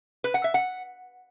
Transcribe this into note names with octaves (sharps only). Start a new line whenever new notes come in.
B4
F#5
E5
F#5